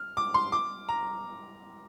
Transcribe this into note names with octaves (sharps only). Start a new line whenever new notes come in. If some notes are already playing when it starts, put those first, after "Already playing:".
Already playing: F6
D6
C6
D6
A#5